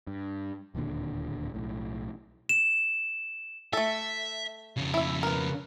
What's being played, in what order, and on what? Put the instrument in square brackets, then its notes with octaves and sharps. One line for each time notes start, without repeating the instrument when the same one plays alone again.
[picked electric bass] G2
D1 D#2 A#2 D3
B1 A2
[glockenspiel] E7
[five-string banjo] A3 A4 [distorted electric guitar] E5
[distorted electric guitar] F2 C#3
[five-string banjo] E4 E5
A#4 B4